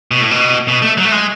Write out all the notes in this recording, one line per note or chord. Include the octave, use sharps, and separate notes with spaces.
B2
A2
B2
B2
A3
F#3
A3
G#3